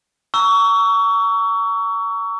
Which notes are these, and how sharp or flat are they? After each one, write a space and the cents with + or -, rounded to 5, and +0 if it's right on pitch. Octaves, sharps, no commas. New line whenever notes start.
A#5 -20 C#6 +30 E6 +0